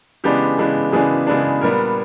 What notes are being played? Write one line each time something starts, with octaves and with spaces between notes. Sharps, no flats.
C#3 E3 G#3 B3 D4 G4
C#3 E3 G#3 B3 D4
C#3 E3 G#3 B3 D4 G#4
C#3 E3 G#3 B3 D4
A#2 G3 B3 D4 A#4